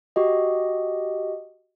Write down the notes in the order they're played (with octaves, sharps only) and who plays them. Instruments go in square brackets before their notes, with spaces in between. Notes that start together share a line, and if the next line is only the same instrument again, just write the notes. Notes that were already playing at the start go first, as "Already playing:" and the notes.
[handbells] F#4 G4 D#5